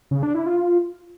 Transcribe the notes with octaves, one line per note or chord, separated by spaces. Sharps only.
C#3
D4
E4
F4